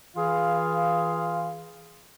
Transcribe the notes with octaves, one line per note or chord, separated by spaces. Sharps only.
E3 F4 G#4 F5